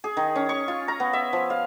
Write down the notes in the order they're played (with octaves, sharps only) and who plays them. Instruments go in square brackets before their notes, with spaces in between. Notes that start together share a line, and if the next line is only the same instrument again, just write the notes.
[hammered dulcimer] G#4
D#3
C#4
C#6
F4
A#5
B3
E5
F3
F5